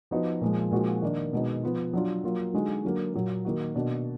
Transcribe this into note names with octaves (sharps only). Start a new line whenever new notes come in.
F3 B3 D#4 F#4
A#2 F3 G#3
A#2 F3 G#3 D#4 F#4
D#3 A#3 D4
B2 G#3 B3 D#4
F3 B3 F4
F#3 D4 F4
F#3 A#3 F4
D3 G#3 D#4 F#4
D3 F#3 A#3
A#2 F#3 A#3
D#3 A#3 D#4 F#4
B2 A#3 D4